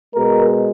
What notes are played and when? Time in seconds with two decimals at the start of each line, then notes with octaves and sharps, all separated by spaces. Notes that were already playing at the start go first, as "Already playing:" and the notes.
0.14 B2 G#3 A#4